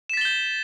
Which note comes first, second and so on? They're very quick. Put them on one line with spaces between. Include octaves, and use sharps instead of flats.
E7 B6 A6 G7 G6